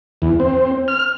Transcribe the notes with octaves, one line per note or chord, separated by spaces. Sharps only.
E2
C4
F6